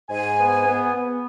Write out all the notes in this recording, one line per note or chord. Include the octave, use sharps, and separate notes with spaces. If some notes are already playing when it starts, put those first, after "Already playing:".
G#2 G#5
B3
B3
B3